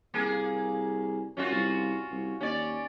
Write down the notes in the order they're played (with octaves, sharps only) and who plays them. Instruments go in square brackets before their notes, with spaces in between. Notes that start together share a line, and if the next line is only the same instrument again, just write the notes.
[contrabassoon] C2 [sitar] A#3 G#4
[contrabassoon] F#2 [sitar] C#4 F4 F#4
[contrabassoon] C2
C2
[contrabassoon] D#2 [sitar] C#4 D5